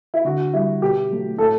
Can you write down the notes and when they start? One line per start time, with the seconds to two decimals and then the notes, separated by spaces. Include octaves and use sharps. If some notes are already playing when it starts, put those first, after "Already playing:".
0.14 E4
0.24 D3 F#4
0.53 G3 E4
0.82 B2 G4
1.10 F#3 A3
1.38 A2 A4